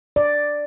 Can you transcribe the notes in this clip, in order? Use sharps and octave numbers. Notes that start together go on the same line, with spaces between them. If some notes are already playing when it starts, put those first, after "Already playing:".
D5